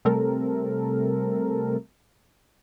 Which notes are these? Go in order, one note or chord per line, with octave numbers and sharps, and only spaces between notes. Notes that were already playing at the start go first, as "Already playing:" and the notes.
C3 G3 A3 C4 A4 A#4